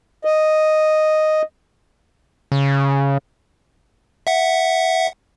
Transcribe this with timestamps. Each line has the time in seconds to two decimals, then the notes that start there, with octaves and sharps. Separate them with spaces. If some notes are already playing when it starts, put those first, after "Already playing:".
0.25 D#5
2.52 C#3
4.27 E5 F#5